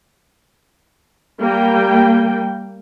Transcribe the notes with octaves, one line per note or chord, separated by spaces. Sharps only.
G3 A#3 G5